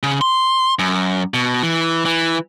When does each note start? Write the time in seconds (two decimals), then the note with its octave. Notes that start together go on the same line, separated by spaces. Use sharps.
0.03 C#3
0.21 C6
0.79 F#2
1.34 B2
1.63 E3
2.05 E3